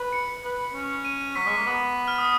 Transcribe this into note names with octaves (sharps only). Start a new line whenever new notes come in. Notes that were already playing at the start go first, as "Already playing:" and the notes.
Already playing: B4
C#7
B4
C#4
D#7
F#3 B6
G#3
A#3
B3
F6
D#6